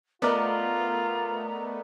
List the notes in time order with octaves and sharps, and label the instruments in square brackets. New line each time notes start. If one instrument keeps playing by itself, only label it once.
[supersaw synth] A3 B3 [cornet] F4 [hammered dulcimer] A#4 D5 D#5 [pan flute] A#5